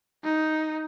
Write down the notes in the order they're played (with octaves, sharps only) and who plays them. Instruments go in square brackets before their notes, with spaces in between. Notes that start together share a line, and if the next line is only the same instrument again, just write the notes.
[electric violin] D#4